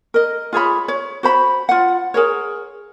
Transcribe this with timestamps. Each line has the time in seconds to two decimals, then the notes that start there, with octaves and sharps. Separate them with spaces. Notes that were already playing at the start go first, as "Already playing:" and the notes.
0.14 A#4 D#5
0.53 F4 G#4 C#5 B5
0.88 C#5
1.23 F#4 C5 B5
1.69 F4 F#5
2.14 G#4 A#4 C#5